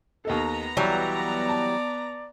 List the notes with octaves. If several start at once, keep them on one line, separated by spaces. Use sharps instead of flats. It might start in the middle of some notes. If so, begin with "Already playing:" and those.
D#2 B3 D#4 A4 A#5
B1 E3 F#3 G3 C#5 D5
A5